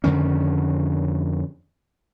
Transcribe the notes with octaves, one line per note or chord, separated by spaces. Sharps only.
F2 D3 D#3 C#4